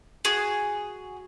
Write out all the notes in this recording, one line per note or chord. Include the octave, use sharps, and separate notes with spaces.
F#4 G#4